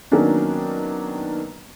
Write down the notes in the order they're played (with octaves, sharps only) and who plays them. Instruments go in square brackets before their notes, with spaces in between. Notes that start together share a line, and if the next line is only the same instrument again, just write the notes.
[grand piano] D#3 F#3 A#3 B3 C#4 D4